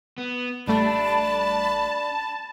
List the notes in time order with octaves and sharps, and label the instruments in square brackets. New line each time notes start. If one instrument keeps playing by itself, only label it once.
[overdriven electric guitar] B3
[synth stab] A1 G3 A3 [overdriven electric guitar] D4 [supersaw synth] A5 [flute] B5